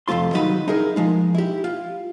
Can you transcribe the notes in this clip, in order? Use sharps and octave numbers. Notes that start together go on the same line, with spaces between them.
F2 C3 A3 F4 C6
D#3 F#3 G3 B3 D#4 B4
D#4 E4 G#4 A#4
F3 G#3 D#4
E4 G4
F4